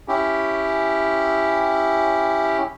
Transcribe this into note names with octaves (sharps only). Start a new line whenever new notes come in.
C#4 E4 G4